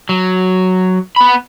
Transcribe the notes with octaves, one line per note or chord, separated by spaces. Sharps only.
F#3
B3 B5